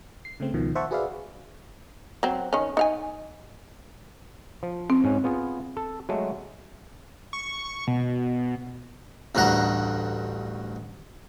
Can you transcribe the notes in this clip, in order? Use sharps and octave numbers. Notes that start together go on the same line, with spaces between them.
C7
C#3 A3 C4
C#2 B2 D#3 F3
C5 E5 F#5 A5 C#6
F#4 G#4 B4 D5 E5 F5
F#3 C4
D#3 C#4
D#4 F5 G#5
F3
C4
G#2 C#4
B3 F4 G#4
A4
F#3 G#3 A3
C#6
B2
A1 D2 G2 D4 F#5 A#5